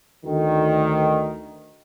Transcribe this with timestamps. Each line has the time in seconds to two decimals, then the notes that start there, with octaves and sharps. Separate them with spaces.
0.25 D2 D#3